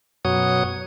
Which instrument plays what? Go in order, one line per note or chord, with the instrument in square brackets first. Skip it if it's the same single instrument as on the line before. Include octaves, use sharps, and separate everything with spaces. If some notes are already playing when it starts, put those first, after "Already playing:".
[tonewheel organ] F#2 B2 F#3 C#5 D#6